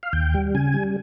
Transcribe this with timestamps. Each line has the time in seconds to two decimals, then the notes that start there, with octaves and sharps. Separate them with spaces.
0.03 F5
0.13 D#2 G5
0.34 G3
0.54 C#3 G#5
0.74 G3